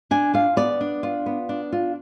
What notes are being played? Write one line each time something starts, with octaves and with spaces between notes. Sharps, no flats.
D4 G#5
F4 F5
B3 D5
D4
F4
B3
D4
F4